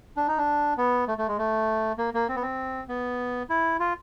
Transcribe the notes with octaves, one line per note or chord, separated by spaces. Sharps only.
D4
D#4
D4
B3
A3
A3
G#3
A3
A#3
A#3
C4
B3
C4
B3
E4
F4